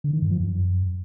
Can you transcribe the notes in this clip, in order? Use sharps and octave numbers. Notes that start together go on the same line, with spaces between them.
D3
D#3
G2
F3
F#2